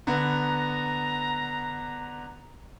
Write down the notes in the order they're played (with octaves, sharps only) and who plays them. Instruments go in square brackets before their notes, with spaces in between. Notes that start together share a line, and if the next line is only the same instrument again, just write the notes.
[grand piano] D3 B3 [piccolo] A#5